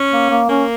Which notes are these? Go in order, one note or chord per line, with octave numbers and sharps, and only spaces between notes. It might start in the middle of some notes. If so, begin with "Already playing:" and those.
Already playing: C#4
A#3
A#3
A#3 C#4